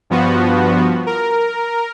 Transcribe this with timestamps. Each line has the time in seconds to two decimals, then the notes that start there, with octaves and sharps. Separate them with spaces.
0.10 G2 F3 B3 F#4
1.07 A#4